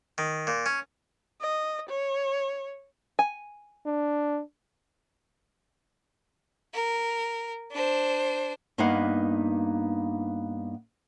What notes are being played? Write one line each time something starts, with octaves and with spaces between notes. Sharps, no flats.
D#3
A#2
C#4
D#5
C#5
G#5
D4
A#4
D4 C5
G2 A#3 B3 D#4 F5 F#5